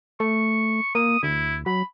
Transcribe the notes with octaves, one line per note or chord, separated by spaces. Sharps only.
A3 C#6
A#3 D#6
D2 E4
F#3 B5